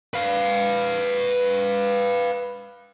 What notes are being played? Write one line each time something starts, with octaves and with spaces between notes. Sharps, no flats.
B4 F5